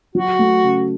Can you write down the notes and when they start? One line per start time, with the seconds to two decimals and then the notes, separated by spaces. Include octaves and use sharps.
0.15 F#3 F#4
0.39 A3
0.64 C#3